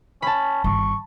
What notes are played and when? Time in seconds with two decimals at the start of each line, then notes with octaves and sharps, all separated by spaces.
0.22 C#4 A5 B5
0.64 G1 D#3 C#6